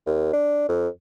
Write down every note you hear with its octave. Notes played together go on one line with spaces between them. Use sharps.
D#2
D4
F2